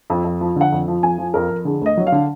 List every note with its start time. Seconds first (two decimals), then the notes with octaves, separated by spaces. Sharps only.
0.10 F2
0.25 F2
0.41 F3
0.56 D3 F#5
0.72 F2
0.88 F3
1.03 F2 G#5
1.18 F3
1.34 F2 A#4
1.50 F2
1.65 D3 G#4
1.81 D2 D#5
1.97 F#3
2.07 F5
2.12 D3